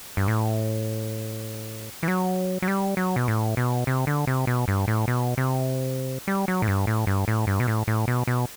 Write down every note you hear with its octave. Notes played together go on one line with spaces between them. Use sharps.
G2
A2
E3
F#3
F#3
G3
F#3
B2
A2
B2
C3
D3
C3
B2
G2
A2
B2
C3
G3
F#3
A2
G2
A2
G2
A2
G2
B2
A2
A2
B2
B2